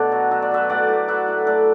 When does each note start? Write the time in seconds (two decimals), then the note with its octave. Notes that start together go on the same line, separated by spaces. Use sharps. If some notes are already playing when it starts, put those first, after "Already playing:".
Already playing: B2 A3 D4 F#4 A4 D5
0.12 F#3
0.31 F#3 E5
0.42 D5
0.51 F#3 B4 E5
0.70 A2 D5 F#5
0.89 A2
1.08 F#3 B4 E5
1.28 A2
1.46 A2 A4 D5